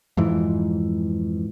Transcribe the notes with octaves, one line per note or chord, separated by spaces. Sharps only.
F2 G#2 E3